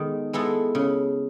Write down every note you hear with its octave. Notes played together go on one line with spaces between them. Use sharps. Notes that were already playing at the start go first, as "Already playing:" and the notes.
Already playing: D#3 G#3 B3 A4
G#3 B3 E4 A4
C#3